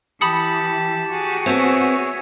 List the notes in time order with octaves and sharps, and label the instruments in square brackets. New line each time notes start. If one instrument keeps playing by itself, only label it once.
[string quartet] E3 [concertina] G4 A5 [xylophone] B5 D#6 C#7
[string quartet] F#4 G#4
[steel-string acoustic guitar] B3 C4 [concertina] C#5 E5